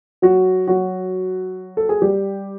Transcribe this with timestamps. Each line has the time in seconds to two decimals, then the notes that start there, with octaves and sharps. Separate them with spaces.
0.22 F#3 F#4
0.67 F#3 F#4
1.77 A4
1.89 G#4
2.02 G3 G4